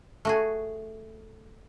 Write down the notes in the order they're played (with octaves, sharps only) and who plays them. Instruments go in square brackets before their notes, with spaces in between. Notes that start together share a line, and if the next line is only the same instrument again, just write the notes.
[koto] A3 F#4 G#4